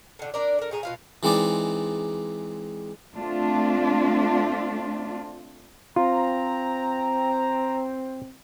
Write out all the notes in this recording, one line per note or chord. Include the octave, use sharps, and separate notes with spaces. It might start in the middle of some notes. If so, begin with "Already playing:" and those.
A2 D3
D4 A#4 D5
A4 A#4
A2 G#4 A#5
B2 F4 F5
E3 G#3 C4 D#4 D5
A3 C4 D4 F4
C4 F4 A#5